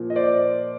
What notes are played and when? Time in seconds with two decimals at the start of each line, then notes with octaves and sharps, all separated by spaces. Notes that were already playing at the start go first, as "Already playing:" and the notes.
Already playing: A#2 F3
0.10 D#5
0.16 C5 D5